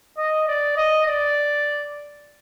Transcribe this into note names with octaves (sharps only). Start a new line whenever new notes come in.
D#5
D5
D#5
D5